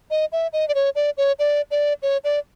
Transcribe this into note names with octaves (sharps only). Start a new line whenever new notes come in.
D#5
E5
D#5
D5
C#5
D5
C#5
D5
D5
C#5
D5